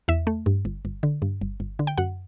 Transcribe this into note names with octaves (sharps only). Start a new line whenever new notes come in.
E2 E5
A3
G2
G1
G1
D3
G2
G1
G1
D3
G5
F#2 F#5